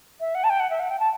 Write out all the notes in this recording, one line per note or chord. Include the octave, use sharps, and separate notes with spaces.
E5
F#5
A5
G5
F#5
E5
F#5
G5
A5